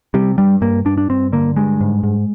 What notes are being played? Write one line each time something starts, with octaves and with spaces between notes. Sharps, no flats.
C3 G3
G2 G3
G2 A#3
G2 D4
D4
G2 C4
D3 A#3
G2 G#3
G#2
G#2